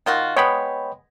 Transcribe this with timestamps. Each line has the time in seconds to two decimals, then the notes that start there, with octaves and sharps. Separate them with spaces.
0.06 D#3 F4 F#4
0.37 G#3 B3 C#5 G5 B5